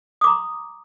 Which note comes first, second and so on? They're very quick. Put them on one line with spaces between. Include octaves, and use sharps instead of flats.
D#6 D6 A#5 C6